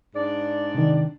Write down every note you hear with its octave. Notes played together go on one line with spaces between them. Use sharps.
G#2 D4 D5
C3 D#3